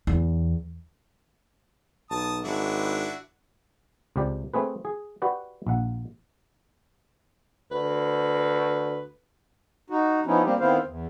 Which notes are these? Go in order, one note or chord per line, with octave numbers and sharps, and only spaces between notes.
E2
B1 A5 D#6
G#1 D4 E4 F#4
C#2 C3 G4 D5
A3 C4 G#4 B4
G#4
F#4 G4 B4 D5 F#5
A#1 F#5
D2 B4
D#4 F#4
F3 B3 C#4 D#4 E4
G3 A#3 C4 G4
D#3 B3 C4 E4 C5 F5
E2